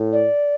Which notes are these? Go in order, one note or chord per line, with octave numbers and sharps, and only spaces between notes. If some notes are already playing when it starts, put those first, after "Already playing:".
Already playing: A2
D5